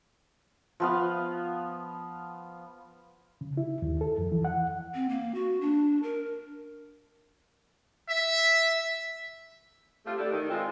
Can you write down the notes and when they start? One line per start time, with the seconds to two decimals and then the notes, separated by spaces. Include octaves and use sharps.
0.80 F3 B3 F5
3.41 C#3
3.57 E4
3.82 D#2
4.01 A4
4.18 F2
4.32 E3
4.45 F#5
4.94 C4
5.09 A#3
5.35 F#4
5.61 D4
6.03 A#4
8.09 E5
10.06 A3 C4 F4 G4
10.18 A3 D4 E4 G4 A4
10.31 D#3
10.50 D#3 G#3 C4 F4